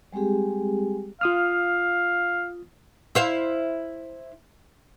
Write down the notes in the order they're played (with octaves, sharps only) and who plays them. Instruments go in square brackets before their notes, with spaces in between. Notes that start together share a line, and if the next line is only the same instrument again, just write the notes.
[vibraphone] G3 G#3 C4 G4 G#4
[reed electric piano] F4 D#6 F6 [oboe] F5
[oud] E4 C5 F5